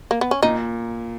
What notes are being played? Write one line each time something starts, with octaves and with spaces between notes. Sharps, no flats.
A#3
B3
C#4
A#2 D#4